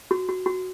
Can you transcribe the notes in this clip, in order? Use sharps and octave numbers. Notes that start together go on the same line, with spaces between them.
F#4
F#4
F#4